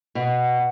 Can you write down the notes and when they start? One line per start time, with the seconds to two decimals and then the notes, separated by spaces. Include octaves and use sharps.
0.15 B2